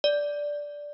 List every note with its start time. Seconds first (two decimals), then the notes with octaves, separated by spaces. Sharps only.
0.04 D5